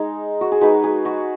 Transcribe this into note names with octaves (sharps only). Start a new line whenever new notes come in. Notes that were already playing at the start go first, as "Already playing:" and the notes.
Already playing: G#3 D#4
F#4
G#4
G#3 D#4 F#4 B4
G#4
F#4